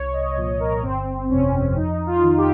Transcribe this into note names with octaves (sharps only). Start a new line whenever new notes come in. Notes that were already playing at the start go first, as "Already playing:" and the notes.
Already playing: C2 C#5
D#5
A#2 F3 D#5
A#4
G1 C4
F2 C3 C#4
F2 D#4
F4
D#3
G4